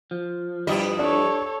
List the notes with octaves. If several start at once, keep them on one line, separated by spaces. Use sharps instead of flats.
F3
G2 G3 E4 D#5
D4 A4 C#5